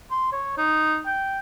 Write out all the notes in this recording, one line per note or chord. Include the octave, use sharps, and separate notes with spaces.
C6
C#5
D#4
G5